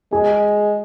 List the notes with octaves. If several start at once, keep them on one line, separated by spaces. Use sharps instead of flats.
G#3 G#4